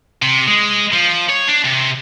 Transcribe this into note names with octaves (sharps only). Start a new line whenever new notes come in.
C3
G#3
F3
C#5
D4
C3